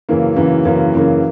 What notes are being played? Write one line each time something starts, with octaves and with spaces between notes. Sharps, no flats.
F#2 C#3 E3 A#3
F#2 C#3 E3 A#3
F#2 C#3 E3 A#3
F#2 C#3 E3 A#3